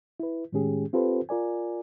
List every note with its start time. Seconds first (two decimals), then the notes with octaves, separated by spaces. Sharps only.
0.20 E4 B4
0.52 A2 D#3 G#3 C#4 G4 G#4
0.93 C4 F4 G4 A4 B4 C5
1.29 F4 A#4 D5 G#5